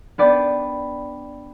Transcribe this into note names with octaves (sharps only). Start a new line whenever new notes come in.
B3 D4 B4 D5 G5